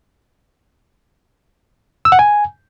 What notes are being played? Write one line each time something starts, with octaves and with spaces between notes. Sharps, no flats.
E6
F#5
G#5